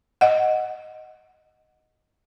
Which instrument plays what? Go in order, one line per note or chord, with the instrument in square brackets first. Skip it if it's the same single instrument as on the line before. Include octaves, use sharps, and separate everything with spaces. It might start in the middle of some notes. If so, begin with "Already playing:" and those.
[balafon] D#5 F#5